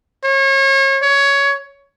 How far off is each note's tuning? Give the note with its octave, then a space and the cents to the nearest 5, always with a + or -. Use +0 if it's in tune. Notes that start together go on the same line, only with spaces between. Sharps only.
C#5 -35
C#5 +15